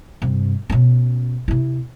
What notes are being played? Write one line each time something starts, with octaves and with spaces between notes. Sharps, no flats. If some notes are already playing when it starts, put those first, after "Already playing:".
G2 C3
B2 C#4
C3 E4